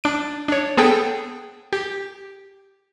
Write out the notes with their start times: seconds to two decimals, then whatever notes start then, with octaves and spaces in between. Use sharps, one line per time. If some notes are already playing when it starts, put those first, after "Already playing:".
0.04 D4 D7
0.48 D4 C#5
0.77 B3 G#4 A4 G5
1.73 G4